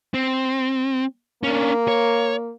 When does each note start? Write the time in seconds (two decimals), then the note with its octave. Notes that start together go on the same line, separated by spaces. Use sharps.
0.14 C4
1.43 A#3 C#4 D4
1.88 C#5